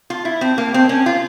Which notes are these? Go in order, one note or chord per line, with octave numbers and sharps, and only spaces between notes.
F4
E4
C4
A#3
C4
C#4
F4